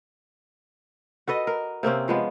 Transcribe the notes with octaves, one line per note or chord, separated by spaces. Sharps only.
F#4 A4 B4 D#5
A#4
C3 A#3 C4 C#4
F3 G#3 B3